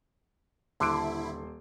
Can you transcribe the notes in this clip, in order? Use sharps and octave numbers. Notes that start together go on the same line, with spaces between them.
D#1 D3 E4 C6 D7